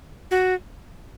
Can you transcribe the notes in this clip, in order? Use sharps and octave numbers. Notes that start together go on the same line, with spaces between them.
F#4